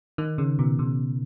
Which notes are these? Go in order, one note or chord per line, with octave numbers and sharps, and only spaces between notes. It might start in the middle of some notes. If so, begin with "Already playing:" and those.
D#3
C#3
B2
C#3